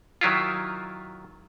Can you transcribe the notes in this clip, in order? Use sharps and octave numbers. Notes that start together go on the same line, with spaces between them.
D#3 F#3 E4 F4